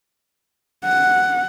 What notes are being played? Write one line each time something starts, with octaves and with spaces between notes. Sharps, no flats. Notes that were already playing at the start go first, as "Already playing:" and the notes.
F#5